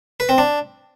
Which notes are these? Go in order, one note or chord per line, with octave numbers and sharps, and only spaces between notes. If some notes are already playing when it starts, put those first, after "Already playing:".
B4
C4
D4